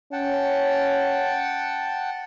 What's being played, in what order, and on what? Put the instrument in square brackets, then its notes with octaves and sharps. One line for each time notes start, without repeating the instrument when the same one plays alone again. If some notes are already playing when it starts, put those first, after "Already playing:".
[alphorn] C#4 [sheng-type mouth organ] F#5 G5 A5